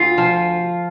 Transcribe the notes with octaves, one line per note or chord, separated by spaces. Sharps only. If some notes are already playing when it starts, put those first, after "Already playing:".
Already playing: D2 F4
F3